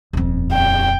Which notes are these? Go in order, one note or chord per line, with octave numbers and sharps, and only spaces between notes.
D#1 F2
G5